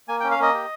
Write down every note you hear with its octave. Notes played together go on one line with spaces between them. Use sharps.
A#3 G#5
G5
C#4
F5
A#3 D#5
G4